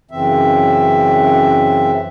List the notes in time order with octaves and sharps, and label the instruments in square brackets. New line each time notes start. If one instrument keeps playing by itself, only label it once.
[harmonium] F#2 C#3 E3 C4 E5